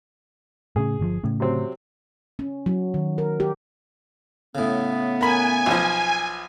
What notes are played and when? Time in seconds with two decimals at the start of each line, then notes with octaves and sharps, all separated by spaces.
0.76 A2 C#3 G#4
0.99 G1 C3 F3
1.24 A2 C#3
1.40 C3 F#3 C4
2.39 C#4
2.66 F#3
2.94 D#3
3.18 A#4
3.40 G4
4.55 A2 C#3 B3
5.21 A#4 G#5 B5
5.66 B1 F3